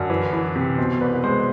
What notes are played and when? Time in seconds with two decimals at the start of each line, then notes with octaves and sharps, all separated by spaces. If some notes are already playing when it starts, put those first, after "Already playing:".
Already playing: F#2 D3
0.10 E3
0.33 E3
0.56 C3
0.78 B2 C5
1.01 C2 B4
1.24 G#3 C5